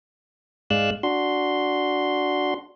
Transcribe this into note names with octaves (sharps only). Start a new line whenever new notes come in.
G#2 G#3 D5 F5 E6 F#6
D4 F#4 C6